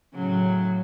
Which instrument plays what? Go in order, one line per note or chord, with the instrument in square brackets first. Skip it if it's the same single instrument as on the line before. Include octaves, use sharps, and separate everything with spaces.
[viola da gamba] A2 C#3 F#3